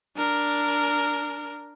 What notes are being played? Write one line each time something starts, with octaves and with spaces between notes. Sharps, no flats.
D4 A#4